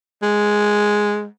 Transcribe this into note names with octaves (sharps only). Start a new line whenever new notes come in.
G#3